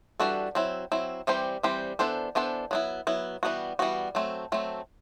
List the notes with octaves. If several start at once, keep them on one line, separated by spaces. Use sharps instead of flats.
E3 G3 D4 F#4 A4
F#3 C4 E4
F#3 C4 E4
E3 G3 C4 G4 C5
E3 G3 C4 G4 C5
E3 B3 D4 A4 C5
E3 B3 D4 A4 C5
F#3 B3 E4
F#3 B3 E4
E3 G3 B3 F#4
E3 G3 B3 F#4
F#3 A3 C4
F#3 A3 C4